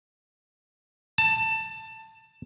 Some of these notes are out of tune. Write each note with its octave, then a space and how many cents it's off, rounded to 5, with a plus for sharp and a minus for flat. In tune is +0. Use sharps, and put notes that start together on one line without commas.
A5 +15